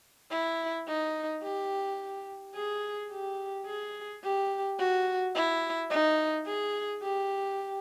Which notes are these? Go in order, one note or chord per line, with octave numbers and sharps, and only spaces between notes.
E4
D#4
G4
G#4
G4
G#4
G4
F#4
E4
D#4
G#4
G4